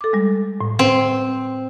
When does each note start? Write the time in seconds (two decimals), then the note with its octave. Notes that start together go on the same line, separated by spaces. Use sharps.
0.01 A4 D6
0.13 G3 G#3
0.61 A2
0.79 C4